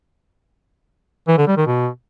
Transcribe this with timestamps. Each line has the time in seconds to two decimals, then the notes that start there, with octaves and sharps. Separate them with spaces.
1.28 E3
1.38 D3
1.47 G3
1.57 D#3
1.67 B2